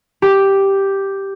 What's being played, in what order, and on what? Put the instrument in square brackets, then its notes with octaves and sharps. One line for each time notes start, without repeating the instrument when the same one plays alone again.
[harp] G4